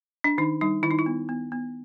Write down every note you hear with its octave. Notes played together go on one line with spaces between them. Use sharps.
D4
D#3 D#4
G3 D#4
D#3 E4
D#4
E4
B3
B3
B3